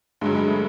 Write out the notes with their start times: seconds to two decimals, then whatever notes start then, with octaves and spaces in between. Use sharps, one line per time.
0.21 G2 D3 F#3 G#3
0.35 G#3
0.48 A3